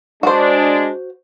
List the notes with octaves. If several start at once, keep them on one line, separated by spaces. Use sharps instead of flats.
G#3 D4 F#4 C5